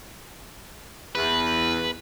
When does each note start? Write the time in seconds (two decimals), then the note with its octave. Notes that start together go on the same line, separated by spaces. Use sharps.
1.15 E2 B4